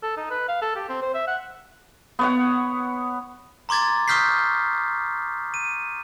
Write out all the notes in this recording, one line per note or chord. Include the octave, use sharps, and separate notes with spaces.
A4
D#4
B4
F5
A4
G4
C4
C5
E5
F#5
B3 C#5 F#5
A#5 C6 D6 G#6 A6
C#6 D#6 F6 G6 B6 C7
D#7